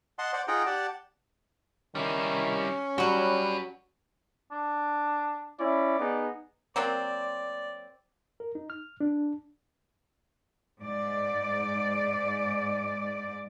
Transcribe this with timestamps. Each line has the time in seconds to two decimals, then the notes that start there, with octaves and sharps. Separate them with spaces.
0.19 D#5 F#5 A5 C6
0.33 C5 D5 F#5
0.48 D#4 F4 G#4 F#5 G5 A#5
0.66 G4 D5 F#5 A5
1.95 D#3 G3 C#4 E4
2.98 F#3 G3 F#4 G4 B4
4.51 D4
5.59 C#4 E4 D5
5.99 B3 D#4 G#4
6.76 F#3 A#3 C4 D5
8.40 A#4
8.55 D#4
8.70 F6
9.01 D4
10.81 G#2 D5